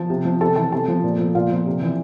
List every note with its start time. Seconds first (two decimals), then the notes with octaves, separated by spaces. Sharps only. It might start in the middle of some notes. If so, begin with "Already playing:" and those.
Already playing: F3 A5
0.10 C3
0.25 F3
0.41 C3 A4 A5
0.56 E3 A4 A5
0.72 C3 A4 A5
0.88 F3
1.04 A#2
1.19 F3
1.35 A#2 F4 F5
1.51 F3
1.66 C3
1.82 E3